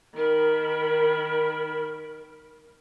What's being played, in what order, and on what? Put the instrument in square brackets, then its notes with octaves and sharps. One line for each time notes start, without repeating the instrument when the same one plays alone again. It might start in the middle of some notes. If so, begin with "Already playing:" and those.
[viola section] D#3 B5 [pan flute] A#4